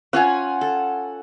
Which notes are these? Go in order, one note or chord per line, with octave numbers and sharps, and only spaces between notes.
C#4 F4 F#5 G#5
A4